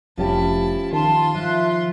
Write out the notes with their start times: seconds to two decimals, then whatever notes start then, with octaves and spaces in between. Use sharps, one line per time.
0.18 F1 F3 C#4 E4 G4 A5
0.93 D#3 F4 A5 C6
1.35 F3 E5 F#6